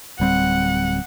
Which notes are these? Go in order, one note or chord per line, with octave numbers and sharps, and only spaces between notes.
D1 G3 C4 F#5